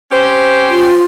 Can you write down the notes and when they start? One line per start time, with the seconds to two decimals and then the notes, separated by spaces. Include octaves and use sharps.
0.12 C#4 G4 C5
0.69 F4